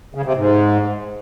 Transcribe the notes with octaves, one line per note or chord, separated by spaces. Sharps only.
C#3
C3
G#2